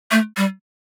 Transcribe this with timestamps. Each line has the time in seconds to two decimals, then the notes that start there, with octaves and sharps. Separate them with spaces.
0.11 A3
0.37 G3